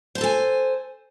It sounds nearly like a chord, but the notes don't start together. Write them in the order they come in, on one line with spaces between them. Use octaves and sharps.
C5 A5 A4 G#5